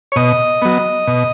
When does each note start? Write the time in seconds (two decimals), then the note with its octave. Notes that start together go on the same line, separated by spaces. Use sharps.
0.12 C#5
0.16 B2 D#5
0.62 F#3 B3
1.07 B2